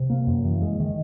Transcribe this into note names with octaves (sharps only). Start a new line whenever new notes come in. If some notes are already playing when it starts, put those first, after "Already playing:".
Already playing: C3
A#3
F#2
E3
G#3
D#3